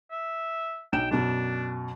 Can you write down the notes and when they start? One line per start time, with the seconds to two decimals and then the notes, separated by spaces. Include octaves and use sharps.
0.11 E5
0.93 B1 G5 E7
1.11 F#2 B2 D4